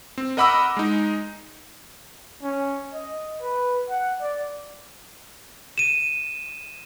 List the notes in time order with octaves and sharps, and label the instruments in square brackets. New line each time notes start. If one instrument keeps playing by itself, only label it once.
[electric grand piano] C4
A#4 D#5 F#5 B5 D6 E6
G#3 D#4
[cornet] C#4
D#5
B4
F#5
D5
[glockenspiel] D#7 E7